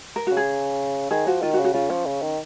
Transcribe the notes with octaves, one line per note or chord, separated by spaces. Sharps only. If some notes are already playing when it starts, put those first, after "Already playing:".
A#4
C#3 F#4
G#4
D#3 G#4
F3 F#4
D#3 F4
F#4
C#3
F#4
C#3 F4
F3 C#4
C#3
D#3